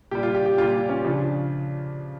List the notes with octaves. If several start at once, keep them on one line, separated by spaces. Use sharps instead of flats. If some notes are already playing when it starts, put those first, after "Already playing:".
A#2 G3 G4
F4
G4
G4
A#2 G3 F4
C#4
C#3 F3 D4